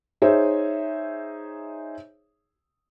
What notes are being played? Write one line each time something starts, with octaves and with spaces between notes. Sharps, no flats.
D#4 G#4 C5 C#5 E5